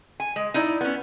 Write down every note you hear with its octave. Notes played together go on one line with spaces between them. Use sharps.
G#5
G#3
D#4 E4 D5
B3 C#4